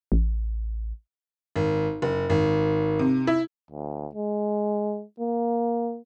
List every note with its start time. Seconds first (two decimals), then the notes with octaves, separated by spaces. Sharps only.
0.12 A1
1.56 G#1
2.02 F#1
2.30 G#1
2.99 C3
3.27 E4
3.71 D2
4.15 G#3
5.20 A#3